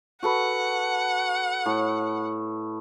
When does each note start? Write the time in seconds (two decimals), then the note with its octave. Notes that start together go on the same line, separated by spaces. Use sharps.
0.23 F#4 A4 B4 F#5
1.66 A2